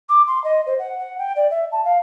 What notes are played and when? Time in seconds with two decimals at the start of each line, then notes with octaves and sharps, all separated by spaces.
0.09 D6
0.27 C6
0.44 D#5
0.66 C5
0.79 F#5
0.98 F#5
1.18 G5
1.36 D5
1.50 E5
1.72 A5
1.84 F5